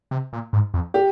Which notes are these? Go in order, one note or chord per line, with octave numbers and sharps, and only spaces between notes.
C3
A#2
G#2
F2
G4